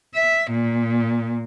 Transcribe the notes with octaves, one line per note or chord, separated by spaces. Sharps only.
E5
A#2